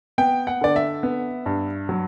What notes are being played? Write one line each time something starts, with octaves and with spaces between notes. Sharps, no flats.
B3 G5
F#5
D3 D5
E5
B3
G2
F#3